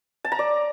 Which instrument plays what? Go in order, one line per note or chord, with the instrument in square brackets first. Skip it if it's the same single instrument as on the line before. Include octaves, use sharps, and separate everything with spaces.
[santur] A5
A#5
D5